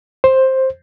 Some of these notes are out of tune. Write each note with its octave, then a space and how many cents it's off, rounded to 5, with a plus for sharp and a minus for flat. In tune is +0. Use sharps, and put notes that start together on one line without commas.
C5 +10